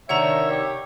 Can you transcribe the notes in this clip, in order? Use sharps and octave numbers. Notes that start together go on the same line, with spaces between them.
C3 D#3 D4 C#5 E5 F#5 A#5
G4